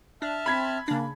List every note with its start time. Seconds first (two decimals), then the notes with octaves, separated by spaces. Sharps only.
0.22 D4 E5 A5 F6
0.46 C4 B5 G#6 B6
0.88 C#3 A#3 D4